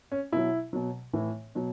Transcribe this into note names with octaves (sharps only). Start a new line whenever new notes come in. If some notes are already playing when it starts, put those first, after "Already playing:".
C#4
B2 F#3 E4
B2 F#3
A2 E3
B2 F#3